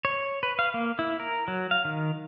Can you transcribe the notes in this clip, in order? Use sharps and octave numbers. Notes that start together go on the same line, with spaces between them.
C#5
B4
F5
A#3
E4
A#4
F#3
F5
D#3